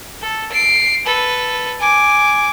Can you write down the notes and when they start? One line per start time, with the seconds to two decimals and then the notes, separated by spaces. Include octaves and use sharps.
0.22 A4
0.52 C7 D7
1.06 A4 B4
1.80 G#5 D6